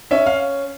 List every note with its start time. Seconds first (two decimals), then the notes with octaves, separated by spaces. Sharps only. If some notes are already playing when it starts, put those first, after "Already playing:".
0.11 C#4 E5
0.26 F5